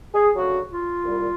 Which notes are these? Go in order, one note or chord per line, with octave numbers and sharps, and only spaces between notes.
G#4
D2 C#3 F#3 F#4
F4
C2 A#2 G3